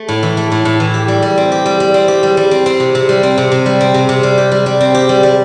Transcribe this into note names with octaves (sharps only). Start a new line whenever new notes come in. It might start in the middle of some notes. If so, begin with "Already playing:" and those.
Already playing: A3
A2
E3
A3
A2
A2
E3
G4
G3
G3
C4
G4
G3
G3
C4
G4
G3
G3
C4
C4
C3
C3
G3
C4
C3
C3
G3
C4
C3
C3
G3
G4
G3
G3
C4
G4
G3
G3